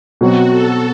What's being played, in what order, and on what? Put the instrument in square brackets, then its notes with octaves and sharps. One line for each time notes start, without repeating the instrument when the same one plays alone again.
[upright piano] B2 F#3 C4 [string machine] F#4
[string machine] A4